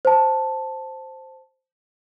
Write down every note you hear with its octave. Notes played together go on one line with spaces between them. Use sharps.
C5 A5